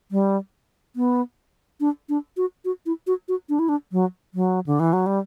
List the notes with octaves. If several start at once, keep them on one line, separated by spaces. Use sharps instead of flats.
G3
B3
D4
D4
F#4
F#4
E4
F#4
F#4
D4
E4
D4
F#3
F#3
D3
E3
F#3
G3